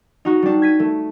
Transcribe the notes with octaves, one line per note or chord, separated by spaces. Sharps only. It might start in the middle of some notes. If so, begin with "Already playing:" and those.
D#4 F#4
G3 D4
G#6 B6 D#7
A3